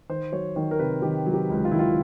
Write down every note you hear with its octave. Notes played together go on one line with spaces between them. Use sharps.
D#3 C5
F#3 C#5
D#3 C#5
A#4
C3 B4
D#3 G4
F#3
G4
C#2
F4
D#3 E4
F4